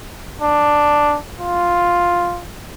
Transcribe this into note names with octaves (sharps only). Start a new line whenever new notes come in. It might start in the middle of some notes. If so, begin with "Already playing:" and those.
D4
F4